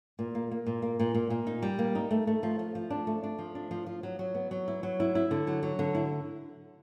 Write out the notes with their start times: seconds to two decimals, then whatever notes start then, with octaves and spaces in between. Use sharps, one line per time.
0.19 A#2
0.35 A#3
0.52 A#3
0.66 A#2
0.82 A#3
1.00 A#2
1.15 A#2
1.30 A#2
1.47 D#4
1.63 G3
1.79 A#3
1.95 D#4
2.11 A3
2.27 A3
2.43 F3
2.59 F3
2.75 F3
2.90 D4
3.07 A3
3.24 D4
3.39 F3
3.55 D4
3.71 F3
3.87 F3
4.03 F#3
4.19 F#3
4.35 B3
4.51 F#3
4.68 E4
4.83 F#3
5.00 E4
5.15 E4
5.31 D3
5.47 F#3
5.63 F#3
5.79 D3
5.95 E4